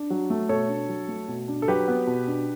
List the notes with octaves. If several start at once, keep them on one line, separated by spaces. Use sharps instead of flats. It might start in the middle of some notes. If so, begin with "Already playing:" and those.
Already playing: D4
F#3
A3
B2 A4 C#5
D4
F#3
A3
B2
D4
A4
F#3 G4 B4
B3
B2
D4